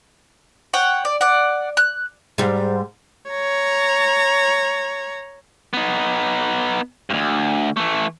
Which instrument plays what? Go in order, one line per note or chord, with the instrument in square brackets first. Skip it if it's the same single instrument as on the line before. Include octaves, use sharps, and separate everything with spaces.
[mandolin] C#5 F#5 G5
D5
D5 F#5
F#6
[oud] G#2 G3
[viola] C#5 A#5
[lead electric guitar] B3 D#4
D2 G2
E3 A3